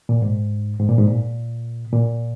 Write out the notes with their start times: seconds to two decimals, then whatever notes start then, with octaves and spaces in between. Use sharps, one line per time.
0.09 A#2
0.22 G#2
0.79 G#2
0.88 A#2
0.98 G#2
1.07 A#2
1.93 A#2